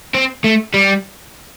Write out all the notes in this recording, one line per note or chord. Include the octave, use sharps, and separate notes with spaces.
C4
A3
G3